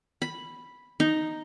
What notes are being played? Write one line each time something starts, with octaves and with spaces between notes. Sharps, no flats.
B5
D#4